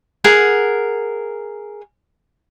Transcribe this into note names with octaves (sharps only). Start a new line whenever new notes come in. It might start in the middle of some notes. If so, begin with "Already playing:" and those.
G#4 A#4 F#5